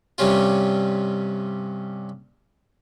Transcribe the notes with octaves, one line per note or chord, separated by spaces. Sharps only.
G2 C3 G3 C#4 F4